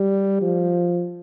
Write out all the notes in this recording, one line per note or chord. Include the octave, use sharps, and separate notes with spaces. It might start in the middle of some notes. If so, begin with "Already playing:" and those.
Already playing: G3
F3